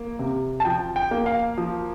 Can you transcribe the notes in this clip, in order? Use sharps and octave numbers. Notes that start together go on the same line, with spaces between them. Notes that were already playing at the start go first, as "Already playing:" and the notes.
Already playing: A#3
C3
A5
F3 G5
G5
A#3
F5
F3